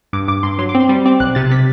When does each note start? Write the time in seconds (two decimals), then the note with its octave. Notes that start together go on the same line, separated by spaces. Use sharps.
0.13 G2 D6
0.28 G2 D6
0.43 G2 C6
0.59 F#3 C6
0.69 D6
0.75 C4
0.80 C6
0.89 G3
1.06 C4 D6
1.20 B1 F#6
1.35 C3 A6
1.51 C3 B6